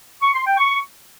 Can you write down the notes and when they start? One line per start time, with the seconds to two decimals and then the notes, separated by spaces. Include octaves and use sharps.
0.22 C#6
0.34 C6
0.46 G5
0.57 C#6